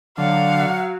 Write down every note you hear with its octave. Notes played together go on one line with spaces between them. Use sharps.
D3 F#3 F5 F#5